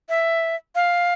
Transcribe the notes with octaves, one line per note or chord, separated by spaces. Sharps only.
E5
F5